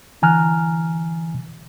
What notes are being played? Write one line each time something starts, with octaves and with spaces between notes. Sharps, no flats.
D3 E3 G#5 A#5 F6 F#6